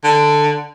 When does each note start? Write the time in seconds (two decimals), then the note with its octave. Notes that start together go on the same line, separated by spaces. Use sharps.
0.04 D3